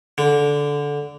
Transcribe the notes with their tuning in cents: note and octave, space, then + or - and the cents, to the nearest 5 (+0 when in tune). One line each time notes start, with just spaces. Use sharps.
D3 -15